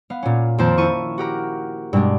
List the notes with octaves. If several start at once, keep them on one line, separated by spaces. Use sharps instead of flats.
B3 F5
A#2 C#4
F2 D#3 A#3 F4 C5 A5
E4 C#6 D#7
F#4 G4 A#4
G2 B2 G#3 D4